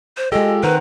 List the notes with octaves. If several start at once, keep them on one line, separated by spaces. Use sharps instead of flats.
C5
G#3 F4 G4 A4 D#5
D#3 C4 B4 C5 F#5 A#5